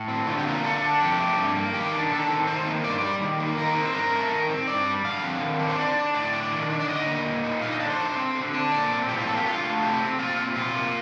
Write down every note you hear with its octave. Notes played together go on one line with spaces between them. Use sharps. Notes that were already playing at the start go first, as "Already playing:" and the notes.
Already playing: A2
C4
D3 F4
G4
A#3 F4
D3 A4
D4
F2 G4
A3
G2
A#3
D#3 G4
D4
D#3 A4
C4
D#3 C5
A#3
G2 D5
C5
G3 D5
D#3
A#3
D#3 A#4
C4
C5
G2 A#4
A3
D#3
C4
G2 D5
G3
D3 F5
C4
D#3
D4
C5
D3 D5
D4
A2 D5
D4
D#3
D4
D5
D3 D#5
A#3
A#2
D#4
D3 F5
D#5
D4 D5
C5
D3
C4
D3
D4
A#2 D5
C4
A2 G4
F4
A#3 A4
G4
D3 F4
A3
C3 G4
C4
A#2 F4
C4
C3 F4
A#3